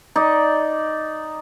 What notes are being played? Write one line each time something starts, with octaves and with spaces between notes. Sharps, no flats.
D#4 D5